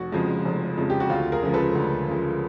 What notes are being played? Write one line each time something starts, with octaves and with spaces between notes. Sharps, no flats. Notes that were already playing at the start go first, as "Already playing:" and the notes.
Already playing: F1 F#4
F2 C#3 F3 G#3
F1
F2 C#3 F3 G#3
G4
F#4
D2 F4
G#4 A#4
C#3 F3 G#3
A4 B4
D2
C#3 F3 G#3